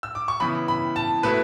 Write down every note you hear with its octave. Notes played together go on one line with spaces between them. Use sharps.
E6
D6
C#6
C#3 E3 B3 E4 B5
B5
A5
B2 A3 E4 B4